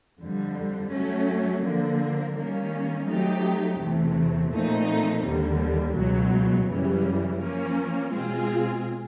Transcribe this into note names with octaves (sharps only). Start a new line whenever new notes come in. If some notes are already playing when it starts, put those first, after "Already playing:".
F2 D3 G3
F#3 A3 C#4
D3 F3 A#3
D#3 G3 A#3 C#4
F#3 A3 C4 D#4 G4
E2 C3 E3 A3
A#2 F3 A3 C4 D#4
D#2 D3 G3
C#2 B2 F#3
F#2 C#3 E3 G3
F3 A#3 C#4
B2 G#3 C4 F4 G#4